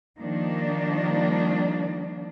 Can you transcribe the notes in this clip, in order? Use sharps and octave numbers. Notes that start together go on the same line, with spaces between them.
D#3 F3 G3 A#3 D4